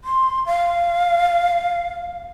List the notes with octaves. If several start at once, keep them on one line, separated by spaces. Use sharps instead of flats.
C6
F5